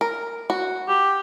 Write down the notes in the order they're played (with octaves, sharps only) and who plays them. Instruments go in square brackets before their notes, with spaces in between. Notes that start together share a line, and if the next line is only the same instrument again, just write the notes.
[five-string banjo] A#4
F#4
[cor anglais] G4